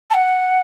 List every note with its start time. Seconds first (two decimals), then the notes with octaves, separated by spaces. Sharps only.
0.10 A5
0.14 F#5